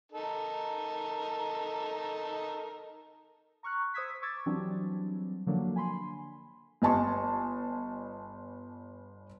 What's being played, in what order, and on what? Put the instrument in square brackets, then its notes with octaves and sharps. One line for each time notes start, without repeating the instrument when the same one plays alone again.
[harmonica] D#4 A4 A#4
[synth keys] A#5 C#6 F6 F#6
C5 C#6 D#6 E6 G#6 B6
C#6 D6 E6 G#6 A6
E3 F#3 G3 C4 D4
D3 F3 F#3 A#3 D4
G#5 B5 C6
[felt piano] G1 D#5 G#5 A5 C6 C#6